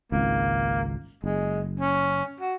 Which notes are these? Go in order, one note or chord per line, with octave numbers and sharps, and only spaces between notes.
G#1 C#2 A#3
F#1 G#3
C#4
F#4